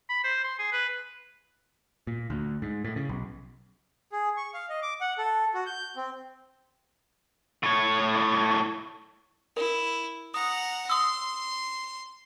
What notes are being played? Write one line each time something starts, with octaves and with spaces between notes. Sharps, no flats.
B5
C5
C6
G#4
B4
A#2
D2
G#2
A2
C#3
B1
G#4
C#6
F5
D#5
D6
F#5
A4
F#4
G6
C4
A2 C#5
E4 A#4
F#5 A#5 D#6
C6 D#6 E6